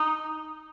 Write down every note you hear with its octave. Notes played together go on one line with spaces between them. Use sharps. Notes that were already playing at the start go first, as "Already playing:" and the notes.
Already playing: D#4